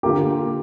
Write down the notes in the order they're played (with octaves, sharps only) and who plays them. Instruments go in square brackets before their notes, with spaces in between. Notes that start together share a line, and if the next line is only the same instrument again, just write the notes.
[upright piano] D3 A#3 F4 A#4 [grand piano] G4